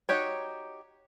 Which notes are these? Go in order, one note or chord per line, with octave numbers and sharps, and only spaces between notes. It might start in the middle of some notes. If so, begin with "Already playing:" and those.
D#4 F#4 G4 C#5